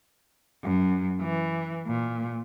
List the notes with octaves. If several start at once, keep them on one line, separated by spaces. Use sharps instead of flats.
F#2
E3
A#2